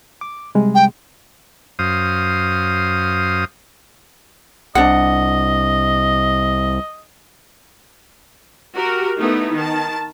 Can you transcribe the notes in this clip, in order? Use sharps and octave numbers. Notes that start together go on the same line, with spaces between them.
D6
C3 G3 G#3
G5
F#2 C5 F5 D#6
C2 D4 D#5 F#5
F#4 G4 A#4
A3 B3 D#4 E4
D#3 A5